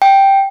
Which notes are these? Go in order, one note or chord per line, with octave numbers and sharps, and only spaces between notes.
G5